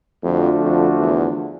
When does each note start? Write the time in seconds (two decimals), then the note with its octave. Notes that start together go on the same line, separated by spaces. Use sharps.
0.23 F2 D3 F3 A3 D4 F#4
0.62 F2
1.00 E2